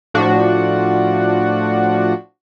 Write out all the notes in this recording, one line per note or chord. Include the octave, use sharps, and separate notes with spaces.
A2 F3 D4 F#4